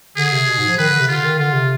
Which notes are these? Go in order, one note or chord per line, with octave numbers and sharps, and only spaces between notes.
D3 G#4
C3
B2
G#2
F3
D#3 B4
D3
C3
D3 F4
D#3
D3 F4
C3